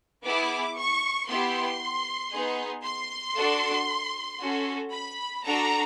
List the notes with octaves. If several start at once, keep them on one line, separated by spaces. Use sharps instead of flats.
B3 E4 G#4 D6
C#6
B3 E4 G4 C6
B3 D#4 G#4
C6
D4 F#4 A4
C#4 F#4 A4
B5
D4 F#4 A4 A#5